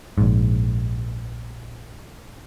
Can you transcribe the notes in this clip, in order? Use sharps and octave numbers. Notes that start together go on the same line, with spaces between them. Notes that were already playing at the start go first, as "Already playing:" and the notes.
A#1 G#2